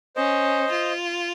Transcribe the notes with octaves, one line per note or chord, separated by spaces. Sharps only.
C#4 C5 D#5
F4